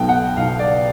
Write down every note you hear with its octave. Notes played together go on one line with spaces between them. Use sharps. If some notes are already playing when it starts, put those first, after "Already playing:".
Already playing: B1 B2 G5
F#5
B1 F5
D5